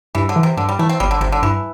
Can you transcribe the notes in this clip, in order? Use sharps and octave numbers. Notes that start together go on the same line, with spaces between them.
G2 E3
D3
E3
C3
G2 D3
G3
E3 A3
C4
G1 G3
D3
G1 C3
D3
G2 E3